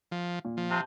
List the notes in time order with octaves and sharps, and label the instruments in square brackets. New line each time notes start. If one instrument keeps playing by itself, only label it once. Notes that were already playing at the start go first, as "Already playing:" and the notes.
[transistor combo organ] F3
[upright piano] A#2
[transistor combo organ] F3
[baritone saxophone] C3 [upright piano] A5 G6